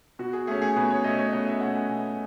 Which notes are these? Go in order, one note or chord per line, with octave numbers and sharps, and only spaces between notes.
B2 F#4
G#4
A3 C#4 G#4
G#4
B2 B4
C#5
A3 C#4 D#5
C#5
B2 D#5
E5
A3 C#4 F#5
G#5
B2 G#5